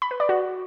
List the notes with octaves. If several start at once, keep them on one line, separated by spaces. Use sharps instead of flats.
B5
B4
D5
F#4